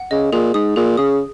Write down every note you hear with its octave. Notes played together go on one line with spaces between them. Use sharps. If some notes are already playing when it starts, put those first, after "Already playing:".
Already playing: F#5
C#3 D#5
A#2 G#4
G#2 D#6
A#2 G#4
C#3 D#6